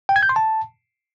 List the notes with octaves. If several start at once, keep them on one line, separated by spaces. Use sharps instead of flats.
G5
G#6
G6
C6
A5